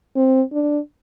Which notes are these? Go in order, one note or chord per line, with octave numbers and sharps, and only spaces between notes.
C4
D4